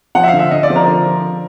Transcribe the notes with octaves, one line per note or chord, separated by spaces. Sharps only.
F3 F#5
E5
F5
D3
E5
D3 D#5
D5
F3
A#4
D3
F3